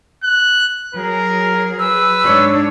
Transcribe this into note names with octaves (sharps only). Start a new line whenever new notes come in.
F#6
F#3 G#4 A#4
B4 E6
G#2 D4 C#5